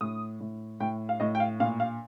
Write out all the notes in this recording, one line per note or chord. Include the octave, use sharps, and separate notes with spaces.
A2 D#6
A2
A2 G5
F5
A2 D#5
G5
F5
A#2 F5
F5